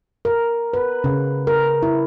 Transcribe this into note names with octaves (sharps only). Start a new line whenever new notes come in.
A#4
B4
C#3
A#4
E4